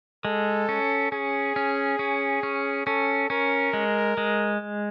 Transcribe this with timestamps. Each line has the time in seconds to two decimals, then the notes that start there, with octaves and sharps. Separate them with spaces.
0.25 G#3 A4
0.69 C#4
1.12 C#4 G#4
1.56 C#4
1.99 C#4
2.43 C#4
2.86 C#4 A4
3.30 C#4 A#4
3.73 G#3
4.17 G#3